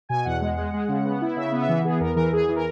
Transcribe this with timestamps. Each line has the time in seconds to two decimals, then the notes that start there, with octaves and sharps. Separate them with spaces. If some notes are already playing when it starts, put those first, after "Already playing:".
0.09 B2 G#5
0.25 E2 F#5
0.41 G#3
0.58 G#3
0.73 G#3
0.88 C#3
1.05 B3
1.21 E4
1.36 C#3 E5
1.52 B3
1.61 E5
1.68 E3
1.84 B3 G#4
2.00 E2 A#4
2.16 E3 A#4
2.32 E2 G#4
2.48 E3
2.56 A#4